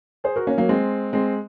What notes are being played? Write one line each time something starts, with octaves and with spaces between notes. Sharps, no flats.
G#4 C5
F#4 A#4
A#3 C#4
F#3 A#3
G#3 C4
G#3 C4